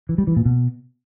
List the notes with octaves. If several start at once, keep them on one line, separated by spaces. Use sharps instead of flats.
E3
G3
E3
A#2
B2